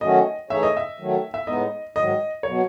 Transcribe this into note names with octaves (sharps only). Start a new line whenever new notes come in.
D#3 F#3 A3 C#4 F#4 D#5
E3 A3 D#4 G#4 C#5 E5
D#5
E5
D#3 F#3 A3
E5
A2 G#3 B3 D#4 D#5
G#2 D#3 F#3 D#5
B2 F#3 C#5